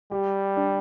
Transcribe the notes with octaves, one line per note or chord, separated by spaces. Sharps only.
G3 G4
D4